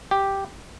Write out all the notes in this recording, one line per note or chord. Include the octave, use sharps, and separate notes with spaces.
G4